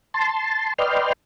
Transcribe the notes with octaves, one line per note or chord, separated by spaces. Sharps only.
A5 C6
B4 D5 D#5 G5 C6 F6